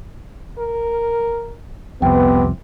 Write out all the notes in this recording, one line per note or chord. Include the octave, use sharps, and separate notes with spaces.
A#4
C2 F2 C3 B3 G5